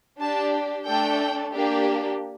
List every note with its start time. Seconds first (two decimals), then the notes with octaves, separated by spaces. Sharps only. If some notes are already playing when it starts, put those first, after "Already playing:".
0.19 D4 G4 A5
0.86 A3 D4 A4 G5
1.53 A#3 D4 G4